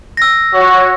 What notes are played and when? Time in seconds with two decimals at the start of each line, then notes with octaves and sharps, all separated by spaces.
0.17 E6 A#6
0.53 F#4 C#5